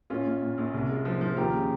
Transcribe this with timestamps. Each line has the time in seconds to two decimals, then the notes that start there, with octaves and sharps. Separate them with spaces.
0.10 A#1 C#4 F4
0.25 A#1
0.41 A#2
0.58 A#1
0.74 C2
0.89 G#3
1.05 F3
1.21 F3
1.36 D#2 G4 A#4
1.53 C#3